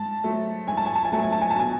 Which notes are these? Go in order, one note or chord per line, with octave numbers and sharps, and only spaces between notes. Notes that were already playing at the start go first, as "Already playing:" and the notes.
Already playing: G#2 A5
F#3 A3
G#2 G#5
A5
G#5
A5
G#5
F#3 A3 A5
G#5
A5
G#5
A5
B2 G#5